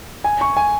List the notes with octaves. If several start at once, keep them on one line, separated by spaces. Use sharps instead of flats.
G#5
C#6
G#5